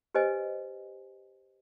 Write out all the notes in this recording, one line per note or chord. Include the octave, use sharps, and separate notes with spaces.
G4 B4 C5 D#5 G#5